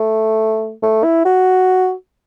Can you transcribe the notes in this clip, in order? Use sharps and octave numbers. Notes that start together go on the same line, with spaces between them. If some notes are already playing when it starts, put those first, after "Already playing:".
Already playing: A3
A3
E4
F#4